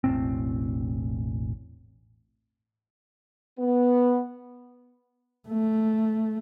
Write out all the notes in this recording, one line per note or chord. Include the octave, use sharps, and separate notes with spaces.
E1 A1 A2 C4
B3
A3